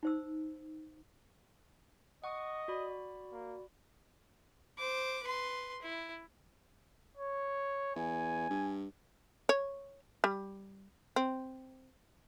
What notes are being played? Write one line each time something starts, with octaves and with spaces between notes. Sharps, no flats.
D#4 C5 E6
D#5 F#5 C#6 D#6
F#4 D5 B5
A#3
C5 D6
B4 C6
E4
C#5
E2 G#5
G2
C#5
G3
C4